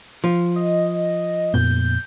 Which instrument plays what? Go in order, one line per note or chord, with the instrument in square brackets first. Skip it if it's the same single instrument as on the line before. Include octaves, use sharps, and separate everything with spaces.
[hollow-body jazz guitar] F3
[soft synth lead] D#5
[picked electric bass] F2 A#2 B3 [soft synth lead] G6